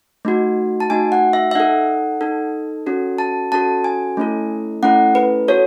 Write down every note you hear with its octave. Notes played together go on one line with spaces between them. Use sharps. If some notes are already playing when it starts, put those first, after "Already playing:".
A3 D#4 F#4
A5
A3 D#4 F#4 G#5
F#5
E5
E5
D#4 A4 F#5
D#4 A4
C#4 F#4 A4
A5
C#4 F#4 A4 A5
G#5
A3 C#4 E4 A4
A3 C#4 E4 A4 F#5
B4
F#4 A4 C#5